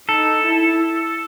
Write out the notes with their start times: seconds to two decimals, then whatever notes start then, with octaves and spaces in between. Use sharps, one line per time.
0.09 D#4 A4
0.45 E4